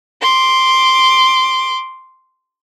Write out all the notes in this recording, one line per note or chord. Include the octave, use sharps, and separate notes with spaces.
C6 D6